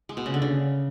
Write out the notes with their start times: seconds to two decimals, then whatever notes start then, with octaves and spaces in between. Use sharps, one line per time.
0.09 G#3
0.17 B2
0.26 C#3
0.34 D3
0.42 C#3